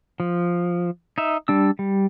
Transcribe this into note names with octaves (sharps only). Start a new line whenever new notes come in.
F3
D#4 E5
G3 D4 E6
G3